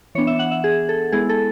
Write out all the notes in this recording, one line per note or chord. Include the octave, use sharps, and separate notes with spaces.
E3 B3 D4 C#5
E5
F#5
E5
G#4
A4
G#3 B3 E4 G#4
A4